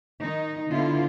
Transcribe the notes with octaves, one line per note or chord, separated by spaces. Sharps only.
D#3 D#4
D3 B3 E4 F4